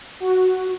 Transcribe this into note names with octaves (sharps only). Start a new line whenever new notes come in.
F#4